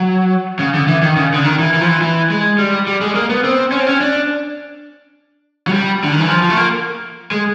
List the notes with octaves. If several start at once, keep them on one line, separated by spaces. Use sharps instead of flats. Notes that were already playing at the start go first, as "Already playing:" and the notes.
Already playing: F#3
C#3
D3
E3
D#3
C#3
D3
D#3
E3
E3
F3
E3
E3
G#3
G3
G3
G#3
A#3
B3
C4
C#4
C4
C#4
D4
F#3
G3
D3
D#3
E3
F3
F3
A3
A#3
G#3